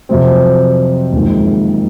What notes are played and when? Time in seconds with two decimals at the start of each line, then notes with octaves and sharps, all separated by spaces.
0.09 F2 C3 F#3 C4
1.12 F#1 F2 D#3 G#3